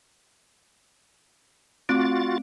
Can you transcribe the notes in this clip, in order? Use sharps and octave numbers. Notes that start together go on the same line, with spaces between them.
A3 C4 F4 F#4 A6 D7